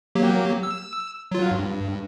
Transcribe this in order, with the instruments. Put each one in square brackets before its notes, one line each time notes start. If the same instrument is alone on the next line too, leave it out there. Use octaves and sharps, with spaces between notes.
[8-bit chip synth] F#3 A#3 G4
E6
F#3 F4
G2